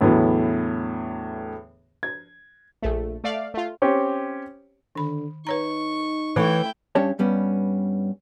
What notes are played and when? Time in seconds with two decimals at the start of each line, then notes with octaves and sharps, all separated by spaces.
0.01 E2 A2 D3 E3 F#3 B3
2.03 G#6
2.82 A#1 A3
3.24 A3 D5 F5
3.54 A3 F4
3.82 C4 C#4 G4 C#5
4.95 D3 D#3 B5
5.47 D#4 B4 C#5 A#5 C#6
6.36 E3 A3 E4 A4 C#5 G5 C#6
6.95 G2 C#4 D4 G4 C#5 A5
7.19 G2 G3 B3 C#4